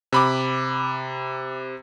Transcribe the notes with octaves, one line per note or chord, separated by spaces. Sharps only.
C3 B5 D6